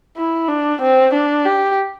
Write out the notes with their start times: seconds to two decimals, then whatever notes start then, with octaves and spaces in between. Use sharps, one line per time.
0.17 E4
0.48 D4
0.81 C4
1.14 D4
1.45 G4